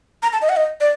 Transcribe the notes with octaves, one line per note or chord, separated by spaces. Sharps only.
A#5
A5
D#5
F#5
D#5
D5